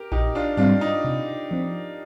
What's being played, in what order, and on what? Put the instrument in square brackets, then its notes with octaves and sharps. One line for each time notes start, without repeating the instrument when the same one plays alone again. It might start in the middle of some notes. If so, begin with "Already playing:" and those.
Already playing: [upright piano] G4 A#4
[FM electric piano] A#1 [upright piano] D#4 G4
[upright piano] D4 F4
[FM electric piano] G#2 G3 C4 [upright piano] D4 F4
[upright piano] D#4
[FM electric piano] C3
F3 C4